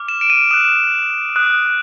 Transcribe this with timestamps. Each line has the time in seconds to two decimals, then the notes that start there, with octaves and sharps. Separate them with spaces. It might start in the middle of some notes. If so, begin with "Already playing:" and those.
Already playing: D6 F6
0.08 E7
0.21 D7
0.30 D#7
0.51 D#6 F#6 E7
1.36 D#6 F#6